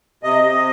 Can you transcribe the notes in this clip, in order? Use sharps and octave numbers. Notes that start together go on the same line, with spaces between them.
C3 D#5
C3